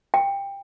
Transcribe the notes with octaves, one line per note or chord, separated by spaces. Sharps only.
G5